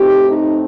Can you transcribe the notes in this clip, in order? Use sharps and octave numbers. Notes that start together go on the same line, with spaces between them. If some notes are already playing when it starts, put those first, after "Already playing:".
Already playing: A2 A3 C4 D#4 G4
D#4